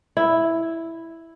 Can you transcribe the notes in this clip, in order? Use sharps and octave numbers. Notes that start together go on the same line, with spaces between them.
E4